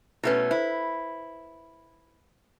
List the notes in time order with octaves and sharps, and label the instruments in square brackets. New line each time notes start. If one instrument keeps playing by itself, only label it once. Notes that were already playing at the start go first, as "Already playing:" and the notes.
[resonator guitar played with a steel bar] B2 A3 C#4 [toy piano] E4 B4
[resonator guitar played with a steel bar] E4 [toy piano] C5